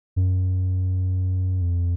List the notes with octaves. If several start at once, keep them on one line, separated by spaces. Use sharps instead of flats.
F#2
F2